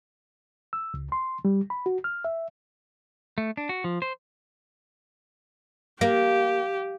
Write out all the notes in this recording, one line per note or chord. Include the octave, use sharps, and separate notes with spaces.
E6
C#2
C6
G3
B5
F#4
F6
E5
A3
D4
F#4
F3
C5
A#3 G4